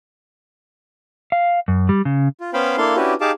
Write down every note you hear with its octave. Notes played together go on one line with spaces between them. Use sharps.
F5
F#2
G3
C#3
F4
B3 C#4 C5 F5 G5 B5
A#3 D4 E4 A4 F5 C6
C#4 D4 E4 F#4 G4 B4
D#4 G4 G#4 F5 A5 D6